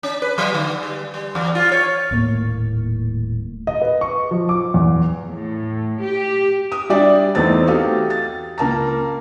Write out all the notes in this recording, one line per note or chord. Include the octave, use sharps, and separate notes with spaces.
C#4
B4
F#3
D3
G3
G3
E2
F4
C#5
D#1 A2 A#3
D#5
B4
C#6
F3
D6
E2
A2
G4
D#6
G3 D4 D5 E5 G5
E2 A3 C4 D#4 A6
F#4 G4 A4 F5 G5 D#6
A6
C#2 A#3 A5 A#5